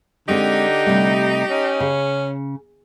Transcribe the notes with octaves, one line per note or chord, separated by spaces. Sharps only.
D3 G#3 C4 D#4 G4
C3 G3 A3
C#4
C#3